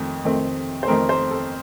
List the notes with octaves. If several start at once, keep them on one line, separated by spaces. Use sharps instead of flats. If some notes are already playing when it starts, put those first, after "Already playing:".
Already playing: F2 D#3 A3 C4
F2 D#3 A3 C4
C5
F2 D#3 A3 C4 A#4
C5
A4